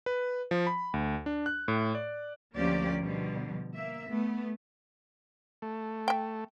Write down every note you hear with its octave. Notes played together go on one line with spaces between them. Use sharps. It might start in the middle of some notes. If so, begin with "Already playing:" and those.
B4
F3
B5
D2
D4
F#6
A2
D5
D2 F3 A#3 C#4 G4 D5
B2 D3 F3 G3
A#3 E5
A3 B3
A3
E5 G5